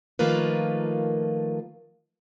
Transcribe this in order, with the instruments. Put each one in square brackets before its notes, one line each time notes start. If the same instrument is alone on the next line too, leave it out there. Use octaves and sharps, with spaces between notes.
[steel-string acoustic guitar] D#3 F3 A3 A#3 F4 B4